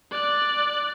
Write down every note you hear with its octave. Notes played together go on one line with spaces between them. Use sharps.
D5 F#6